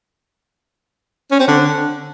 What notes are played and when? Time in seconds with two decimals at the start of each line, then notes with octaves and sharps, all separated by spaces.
1.31 C#4
1.40 C4
1.48 D3